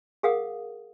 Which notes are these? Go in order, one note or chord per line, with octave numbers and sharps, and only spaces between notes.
G#4 A#4 F5 F#5 D#6